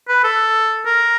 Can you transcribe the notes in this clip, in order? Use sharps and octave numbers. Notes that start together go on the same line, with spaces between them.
B4
A4
A#4